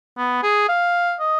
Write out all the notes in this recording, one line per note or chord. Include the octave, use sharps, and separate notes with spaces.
B3
G#4
F5
D#5